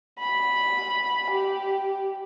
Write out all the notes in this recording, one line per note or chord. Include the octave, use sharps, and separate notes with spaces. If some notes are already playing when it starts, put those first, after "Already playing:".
B5
G4